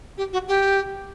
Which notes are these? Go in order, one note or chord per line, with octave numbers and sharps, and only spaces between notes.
G4
F#4
G4